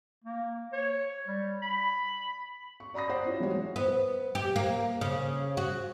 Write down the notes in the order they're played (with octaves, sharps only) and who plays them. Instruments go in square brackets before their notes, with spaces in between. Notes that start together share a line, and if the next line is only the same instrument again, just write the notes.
[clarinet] A#3
C#5
G3
B5
[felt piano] C#6
D5 A#5 B5 D#6 A#6
C5 D5 F#5
C#4 E4 F4
E3 G3 G#3 F#4 C#5
[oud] B3
G4
A#3
C#3
F#4